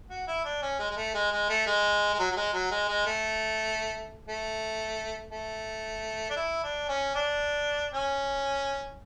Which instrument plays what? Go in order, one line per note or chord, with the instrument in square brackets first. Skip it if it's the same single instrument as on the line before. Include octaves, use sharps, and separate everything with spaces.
[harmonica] F#4
E4
D4
C#4
G#3
G#3
A3
G#3
G#3
A3
G#3
G#3
F#3
F#3
G#3
F#3
G#3
G#3
A3
A3
A3
D4
E4
D4
C#4
D4
C#4